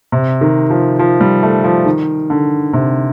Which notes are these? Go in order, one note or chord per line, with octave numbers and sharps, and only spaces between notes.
C3
D#3
F3
F3
G3
A3
F3
D#3
D3
C3